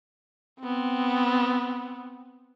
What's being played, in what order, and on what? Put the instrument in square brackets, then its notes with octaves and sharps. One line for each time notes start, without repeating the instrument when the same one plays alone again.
[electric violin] B3 C4